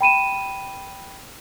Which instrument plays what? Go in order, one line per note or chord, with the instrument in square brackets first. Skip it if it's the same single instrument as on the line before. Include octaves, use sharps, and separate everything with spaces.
[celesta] G5 B5 D#7 E7